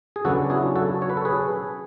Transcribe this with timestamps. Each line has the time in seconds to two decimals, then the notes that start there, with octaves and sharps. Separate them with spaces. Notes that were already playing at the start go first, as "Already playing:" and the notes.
0.16 G#4
0.25 C#3 F#3 B3 D4 F#4 A4
0.50 E4 G#4
0.76 F#4 A4
1.02 C#5
1.10 B4
1.17 A4
1.25 G#4 B4